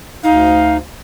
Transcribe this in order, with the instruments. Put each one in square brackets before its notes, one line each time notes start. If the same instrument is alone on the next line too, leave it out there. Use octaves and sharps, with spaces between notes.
[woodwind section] D2 F5 [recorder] D#4